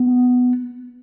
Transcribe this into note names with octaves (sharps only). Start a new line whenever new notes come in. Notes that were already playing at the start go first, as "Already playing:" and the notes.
Already playing: B3